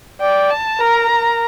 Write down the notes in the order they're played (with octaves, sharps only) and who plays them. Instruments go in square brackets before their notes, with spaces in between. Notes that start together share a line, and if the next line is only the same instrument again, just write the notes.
[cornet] D5 [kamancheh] G5
[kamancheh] A5
[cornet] A#4 [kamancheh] A#5
[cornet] A#4